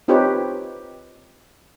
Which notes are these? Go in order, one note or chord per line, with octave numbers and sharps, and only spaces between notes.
C4 D#4 F4 G4 B4 C#5